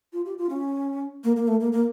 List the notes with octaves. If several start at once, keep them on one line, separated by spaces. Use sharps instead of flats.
F4
G4
F4
C#4
A#3
A#3
A3
A#3
A#3